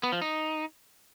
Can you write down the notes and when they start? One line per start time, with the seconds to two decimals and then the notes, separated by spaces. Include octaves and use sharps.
0.03 B3
0.12 F3
0.22 D#4